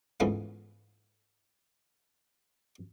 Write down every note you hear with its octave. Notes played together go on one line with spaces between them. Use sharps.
G#2 C#3 E3 F3 A3 B3